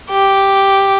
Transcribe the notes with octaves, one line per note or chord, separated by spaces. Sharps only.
G4